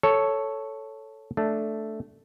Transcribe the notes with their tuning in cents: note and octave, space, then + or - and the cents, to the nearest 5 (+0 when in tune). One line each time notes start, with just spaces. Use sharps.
A4 +0 C#5 +0
A3 +0 D4 +0